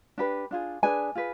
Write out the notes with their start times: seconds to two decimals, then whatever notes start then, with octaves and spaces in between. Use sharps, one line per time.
0.18 D4 G4 B4
0.51 D4 F4 G#4
0.83 D4 G#4 B4 G#5
1.15 F4 G#4 B4